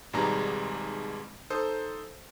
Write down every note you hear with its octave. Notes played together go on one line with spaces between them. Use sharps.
G#1 G#2 B2 G3 G#3 A#5
D#4 A4 C5 D#6